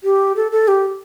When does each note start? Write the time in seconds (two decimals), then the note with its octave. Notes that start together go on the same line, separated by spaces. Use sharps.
0.04 G4
0.36 A4
0.52 A4
0.68 G4